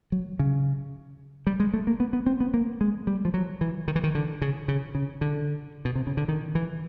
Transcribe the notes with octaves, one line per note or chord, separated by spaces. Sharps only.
F#3
C#3
G3
G#3
A3
A#3
B3
B3
C4
B3
A#3
G#3
G3
F3
F#3
E3
D#3
E3
D#3
D3
C#3
C#3
C#3
D3
B2
C3
C#3
D3
D#3
E3